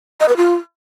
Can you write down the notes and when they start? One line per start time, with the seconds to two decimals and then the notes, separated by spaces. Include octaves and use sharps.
0.20 D#5
0.28 B4
0.37 F4